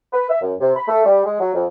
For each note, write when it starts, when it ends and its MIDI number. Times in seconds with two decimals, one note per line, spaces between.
0.13 0.30 71
0.30 0.40 76
0.42 0.54 42
0.60 0.73 48
0.76 0.85 83
0.88 1.05 57
1.06 1.25 55
1.25 1.37 56
1.40 1.53 54
1.54 1.65 41